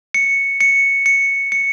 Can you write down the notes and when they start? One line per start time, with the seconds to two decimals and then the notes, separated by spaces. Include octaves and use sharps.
0.14 C#7
0.61 C#7
1.06 C#7
1.52 C#7